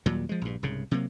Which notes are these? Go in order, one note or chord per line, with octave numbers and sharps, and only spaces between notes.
D#2 A#2 F#3 G3
F3 G#3
A#1 G2
C2 G#2 C#3
C3 F#3 A#3